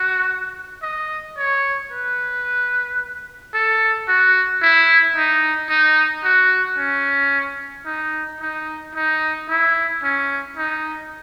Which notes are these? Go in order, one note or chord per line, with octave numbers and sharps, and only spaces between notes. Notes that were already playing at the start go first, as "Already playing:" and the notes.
Already playing: F#4
D#5
C#5
B4
A4
F#4
E4
D#4
D#4
F#4
C#4
D#4
D#4
D#4
E4
C#4
D#4